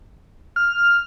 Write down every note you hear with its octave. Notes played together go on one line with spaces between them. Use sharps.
F6